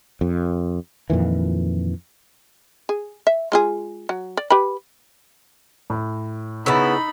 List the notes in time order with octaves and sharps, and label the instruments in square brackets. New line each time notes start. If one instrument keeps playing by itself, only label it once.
[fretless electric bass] F2
F2 A#2 D#3 E3
[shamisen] G#4
E5
G#3 F4 G#4
F#3
D5
G4 B4 B5
[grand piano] A2
[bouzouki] C#3 E4 [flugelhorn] B3 [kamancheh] D#4 B5 [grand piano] E6 A6